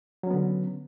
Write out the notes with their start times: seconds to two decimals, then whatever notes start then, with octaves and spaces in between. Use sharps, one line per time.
0.23 F#3
0.27 C#4
0.30 B3
0.34 D3